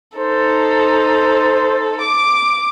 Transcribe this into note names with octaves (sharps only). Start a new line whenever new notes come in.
D#4 A4 C5
D6